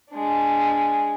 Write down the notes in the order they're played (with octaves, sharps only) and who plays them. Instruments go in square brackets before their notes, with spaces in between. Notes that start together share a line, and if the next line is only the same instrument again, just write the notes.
[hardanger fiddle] G#3 D4